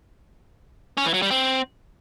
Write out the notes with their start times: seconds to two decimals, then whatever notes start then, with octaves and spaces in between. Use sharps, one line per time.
0.97 C#4
1.06 E3
1.14 F#3
1.22 G3
1.31 C4